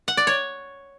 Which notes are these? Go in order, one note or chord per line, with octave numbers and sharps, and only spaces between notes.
F#5
D5
C#5